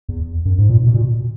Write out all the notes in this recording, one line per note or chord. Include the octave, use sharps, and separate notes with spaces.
E2
F#2
G#2
A#2
B2
A#2